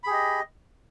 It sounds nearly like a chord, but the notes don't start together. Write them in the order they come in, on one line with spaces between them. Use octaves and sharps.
B5 G#4 G4 D#5